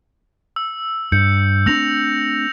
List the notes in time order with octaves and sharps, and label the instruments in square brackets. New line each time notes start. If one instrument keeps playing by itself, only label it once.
[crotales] E6
[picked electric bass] G2 [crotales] G6 C#7
[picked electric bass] A3 C4 D4 [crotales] E6 A#6 F7